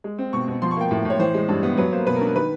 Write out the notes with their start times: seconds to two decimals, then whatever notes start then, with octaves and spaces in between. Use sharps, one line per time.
0.04 G#3
0.18 C4
0.33 B2 C#6
0.48 B2
0.62 F3 C6
0.71 C#6
0.77 A#3 G5
0.91 A2
1.05 A2 C#5
1.19 E3 C5
1.34 G#3
1.49 G2
1.63 B3
1.77 F#3 B4
1.92 A#3 C5
2.07 B2 B4
2.16 A#4
2.21 D4
2.26 A#4
2.36 D#3 B4